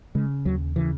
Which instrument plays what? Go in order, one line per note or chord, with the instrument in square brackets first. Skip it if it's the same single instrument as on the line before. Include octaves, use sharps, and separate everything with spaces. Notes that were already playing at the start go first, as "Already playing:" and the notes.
[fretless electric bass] C#3 G#3
D#2 F#3
C#3 E3